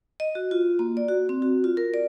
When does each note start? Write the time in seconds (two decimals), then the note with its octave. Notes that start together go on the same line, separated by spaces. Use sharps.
0.20 D#5
0.35 F#4
0.51 F4
0.79 A#3
0.97 D5
1.08 F#4
1.29 C4
1.42 F#4
1.64 F4
1.77 A#4
1.94 D5